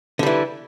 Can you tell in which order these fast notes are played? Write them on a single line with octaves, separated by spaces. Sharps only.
D3 G3 E3